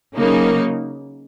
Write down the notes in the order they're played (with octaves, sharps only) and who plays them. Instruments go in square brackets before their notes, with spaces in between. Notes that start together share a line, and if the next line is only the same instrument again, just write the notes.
[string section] C#3 F#3 A#3 D#4